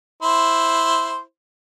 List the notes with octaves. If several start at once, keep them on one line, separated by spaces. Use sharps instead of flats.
E4 C5 C6